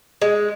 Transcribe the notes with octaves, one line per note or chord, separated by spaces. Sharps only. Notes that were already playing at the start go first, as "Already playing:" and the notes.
G#3